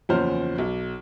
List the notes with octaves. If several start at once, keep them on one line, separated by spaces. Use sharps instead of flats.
F#1 E2 F3 C#4 C5 F6
B1